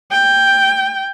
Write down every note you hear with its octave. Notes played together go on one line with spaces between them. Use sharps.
G5